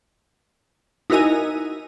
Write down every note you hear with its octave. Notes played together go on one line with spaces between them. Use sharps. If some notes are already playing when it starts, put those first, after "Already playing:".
D#4 E4 F#4 A#4 D#5 G#5